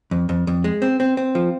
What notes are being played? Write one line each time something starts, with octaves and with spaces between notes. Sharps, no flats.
F2
F2
F2
G#3
C4
C4
C4
F3